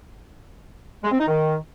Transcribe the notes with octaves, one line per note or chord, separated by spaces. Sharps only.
G#3
C4
D#4
D#3